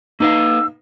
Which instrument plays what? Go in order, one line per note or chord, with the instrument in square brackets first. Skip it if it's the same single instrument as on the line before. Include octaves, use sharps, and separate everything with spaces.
[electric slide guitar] A#3 B4 F5 [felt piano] D#4 [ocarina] E6